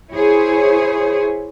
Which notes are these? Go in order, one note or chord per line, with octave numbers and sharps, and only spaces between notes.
E4 G#4 C5 C#5